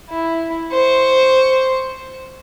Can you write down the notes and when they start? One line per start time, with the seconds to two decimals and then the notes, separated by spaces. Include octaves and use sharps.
0.10 E4
0.72 C5 C#6